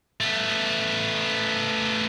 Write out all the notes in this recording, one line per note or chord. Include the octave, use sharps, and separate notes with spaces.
A3 B3